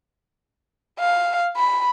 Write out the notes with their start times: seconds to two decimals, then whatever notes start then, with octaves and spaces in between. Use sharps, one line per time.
0.99 F5
1.57 B5